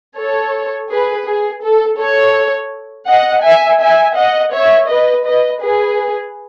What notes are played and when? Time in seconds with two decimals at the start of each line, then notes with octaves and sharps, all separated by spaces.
0.18 A4 C#5
0.91 G#4 B4
1.27 G#4
1.64 A4
1.99 A4 C#5
3.09 D#5 F#5
3.45 E5 G#5
3.81 E5 G#5
4.17 D#5 F#5
4.53 C#5 E5
4.90 B4 D#5
5.26 B4 D#5
5.63 G#4 B4